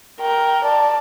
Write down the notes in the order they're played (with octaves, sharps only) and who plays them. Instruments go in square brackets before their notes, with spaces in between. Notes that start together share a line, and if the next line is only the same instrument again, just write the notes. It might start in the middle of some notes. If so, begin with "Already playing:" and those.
[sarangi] A#4 [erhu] G5
[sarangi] D5 [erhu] A5